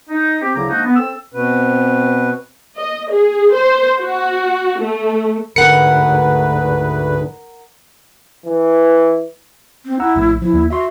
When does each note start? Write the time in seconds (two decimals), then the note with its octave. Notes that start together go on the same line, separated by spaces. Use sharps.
0.09 D#4
0.41 C4 G4
0.55 D2 C#3 F#3 E4 A#5 D6
0.69 F3 G#3 A#3 D4 D#4 F#4
0.85 B3
0.96 C4 A4 E6
1.34 B2 C4 B4
2.77 D#5
3.11 G#4
3.54 C5
4.00 F#4
4.80 A3
5.56 D2 G#2 D3 A#4 B4 F#5 C#7
8.45 E3
9.85 C4
10.00 E4 F#5 A#5 E6
10.16 A#1 A2 E6
10.42 F3 E4
10.53 D#2
10.70 F#4 E5 C6